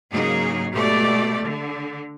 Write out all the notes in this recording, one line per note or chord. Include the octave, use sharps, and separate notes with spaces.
G#2 C#3 F#3 A#3 D#4 G#4
B2 G#3 A3 G4 D5
D3